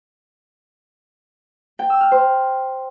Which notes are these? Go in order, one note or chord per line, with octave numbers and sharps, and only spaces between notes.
G5
E6
F6
C5